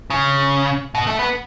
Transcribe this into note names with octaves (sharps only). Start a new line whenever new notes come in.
C#3
B2
A3
B3